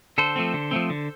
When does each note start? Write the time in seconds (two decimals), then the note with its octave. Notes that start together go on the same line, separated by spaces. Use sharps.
0.18 D3 A4 C5
0.36 F3 A3 C4
0.54 D3
0.71 F3 A3 C4
0.90 D3